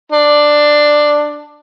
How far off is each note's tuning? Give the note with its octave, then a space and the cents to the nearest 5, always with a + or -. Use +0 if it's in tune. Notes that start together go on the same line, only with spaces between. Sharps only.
D4 +10